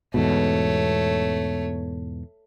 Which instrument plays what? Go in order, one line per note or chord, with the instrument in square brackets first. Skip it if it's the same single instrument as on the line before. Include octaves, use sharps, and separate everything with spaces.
[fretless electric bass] E2 G#2 B2 [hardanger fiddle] A3 C#5